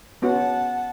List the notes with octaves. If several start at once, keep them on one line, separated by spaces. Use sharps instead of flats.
B3 C#4 F#4 F#5 A5